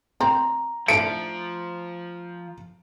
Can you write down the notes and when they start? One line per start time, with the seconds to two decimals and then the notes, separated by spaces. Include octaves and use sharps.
0.21 C4 A#5
0.88 F3 A3 D4 D7